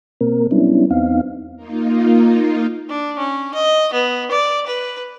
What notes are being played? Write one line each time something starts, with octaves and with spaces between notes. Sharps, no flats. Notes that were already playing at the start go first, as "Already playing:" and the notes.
B2 A#3 C4 A#4
F#3 G3 B3 C#4 D4 E4
E2 B3 C4 D#4 F5
A#3 D#4 F4
D4
C#4
D#5
B3
D5
B4